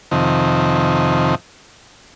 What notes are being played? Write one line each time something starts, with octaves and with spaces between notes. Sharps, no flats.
F2 C3 D#3